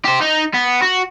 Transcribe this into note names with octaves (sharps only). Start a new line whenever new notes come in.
G4 C5
D#4
B3
F#4